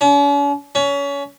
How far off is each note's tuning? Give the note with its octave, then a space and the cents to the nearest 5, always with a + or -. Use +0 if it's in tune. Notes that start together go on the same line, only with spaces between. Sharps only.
C#4 +45
C#4 +25